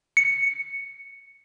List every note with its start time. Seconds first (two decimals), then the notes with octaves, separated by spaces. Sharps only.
0.17 C#7